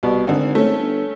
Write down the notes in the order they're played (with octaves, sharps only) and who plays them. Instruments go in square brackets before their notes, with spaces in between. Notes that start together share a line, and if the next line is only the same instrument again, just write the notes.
[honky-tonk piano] C2 [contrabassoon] B2
[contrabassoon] G#1 [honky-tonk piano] D3 D#4
[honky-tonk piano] A3 C#4
[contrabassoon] G1